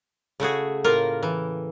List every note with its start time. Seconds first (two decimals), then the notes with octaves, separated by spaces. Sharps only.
0.40 C#3 A3 F#4 G#4
0.84 A2 A#3 F4 A#4
1.23 E3